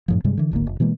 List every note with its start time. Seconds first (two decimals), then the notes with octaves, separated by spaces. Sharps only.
0.08 F#2 A2 F3
0.24 G2 C3 G3 G#3
0.37 D3 E3
0.51 D1 G#1 D3 A#3
0.67 F1
0.80 B2 E3 G#3 A#3